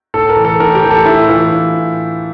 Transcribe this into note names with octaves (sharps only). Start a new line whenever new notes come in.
A2 A4
A#4
E3
A4
A2 A#4
G4
E3
A4
A2 E4
E3 F4
A2